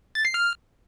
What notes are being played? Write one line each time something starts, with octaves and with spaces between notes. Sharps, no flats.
A6
C7
F6